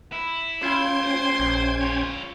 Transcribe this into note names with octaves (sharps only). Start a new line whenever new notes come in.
E4
C#4 F4 G5 C6 G#6
C5
A#1
F4 C#5